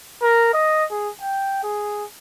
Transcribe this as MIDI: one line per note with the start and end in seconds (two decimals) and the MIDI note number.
0.22 0.50 70
0.53 0.84 75
0.91 1.10 68
1.21 1.59 79
1.63 2.04 68